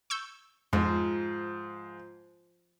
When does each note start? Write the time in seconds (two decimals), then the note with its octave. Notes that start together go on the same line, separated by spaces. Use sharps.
0.10 C#6 E6 G6
0.73 F2 G#2 F3